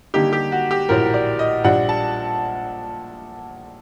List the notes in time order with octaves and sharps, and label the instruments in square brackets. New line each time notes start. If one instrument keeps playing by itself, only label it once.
[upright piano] D3 G3 A#3 D#4 [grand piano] G4
[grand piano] G4
F#4
G4
[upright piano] A#1 A2 F#3 [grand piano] A#4
[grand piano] D5
D#5
[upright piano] A#1 A#2 G3 D4 [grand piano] F#5
[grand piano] A5